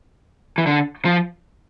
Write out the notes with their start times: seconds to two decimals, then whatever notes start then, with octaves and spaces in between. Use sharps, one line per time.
0.58 E3
0.67 D3
1.05 F3